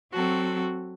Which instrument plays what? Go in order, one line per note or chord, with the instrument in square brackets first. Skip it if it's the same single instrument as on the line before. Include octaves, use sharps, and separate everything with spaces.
[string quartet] F#3 C4 F#4 A4